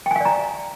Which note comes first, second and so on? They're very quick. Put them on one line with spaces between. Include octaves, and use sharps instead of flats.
G5 G#5 F5 D5 A#5